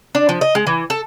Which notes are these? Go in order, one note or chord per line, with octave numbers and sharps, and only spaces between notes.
D4
F3
D#5
G#3
E3
A4